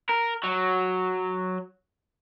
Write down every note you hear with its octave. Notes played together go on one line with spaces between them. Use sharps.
A#4
F#3